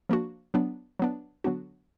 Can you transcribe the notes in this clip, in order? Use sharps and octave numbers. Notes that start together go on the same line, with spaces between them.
F3 A#3 D4 F#4
F#3 B3 D4
F#3 B3 D4
D3 F#3 B3 D4 F#4